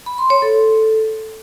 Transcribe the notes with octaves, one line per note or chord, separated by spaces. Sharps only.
B5
C6
C#5
A4